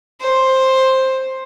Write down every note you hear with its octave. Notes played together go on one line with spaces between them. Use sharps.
C5